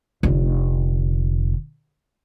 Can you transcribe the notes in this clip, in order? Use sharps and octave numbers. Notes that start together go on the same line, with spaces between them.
F1 D3